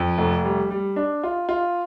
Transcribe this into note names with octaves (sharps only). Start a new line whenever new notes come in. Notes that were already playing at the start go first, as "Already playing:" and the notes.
Already playing: F2
F1
G3
G3
D4
F4
F4